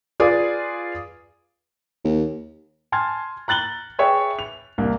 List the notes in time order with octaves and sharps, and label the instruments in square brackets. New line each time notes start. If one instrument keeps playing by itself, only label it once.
[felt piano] F4 G#4 B4 D5
[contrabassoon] D#2
[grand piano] G#5 A5 C6 F6 G#6 A6
A#5 F#6 A6 F#7 G7
G#4 B4 C#5 E5 G5
F7
C2 A#3